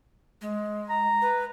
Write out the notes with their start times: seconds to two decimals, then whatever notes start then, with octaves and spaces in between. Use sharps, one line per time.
0.41 G#3
0.90 A#5
1.22 B4